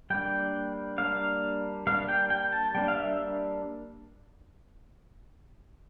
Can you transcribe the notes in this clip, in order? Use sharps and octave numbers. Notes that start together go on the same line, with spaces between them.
G3 A#3 D4 G5
G3 A#3 D4 F5
G3 A#3 D4 F5
G5
G5
A5
G3 A#3 D4 G5
F5
E5